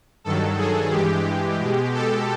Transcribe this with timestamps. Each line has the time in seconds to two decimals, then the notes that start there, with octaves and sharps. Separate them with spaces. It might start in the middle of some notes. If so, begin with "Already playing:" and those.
0.24 G2 D#3 F#3 A4
0.58 G#4
0.92 G2 E3 G#3 G4
1.59 B2
1.64 G#3
1.94 A4